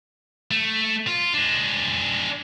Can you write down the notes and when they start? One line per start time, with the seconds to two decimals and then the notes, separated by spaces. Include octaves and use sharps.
0.51 A3
1.07 F4
1.34 G#3 D4